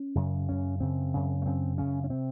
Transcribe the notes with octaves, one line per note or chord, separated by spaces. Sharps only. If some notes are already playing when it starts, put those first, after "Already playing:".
Already playing: C#4
F#2 C#3
F#2 C#3 C#4
F#2 C#3 C4
F#2 C#3
A3
F#2 C#3 C4
F#2 C#3 C#4
C#4
C3 C4